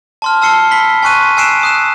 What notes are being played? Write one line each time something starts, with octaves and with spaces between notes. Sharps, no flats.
A5 C6 F6
A5 E6 C7 C#7 G7
B5 B6 G7
G#5 C6 C#6 F#6 D#7
G#5 E6 F#6 C7 D7 E7
D#6 F#6 E7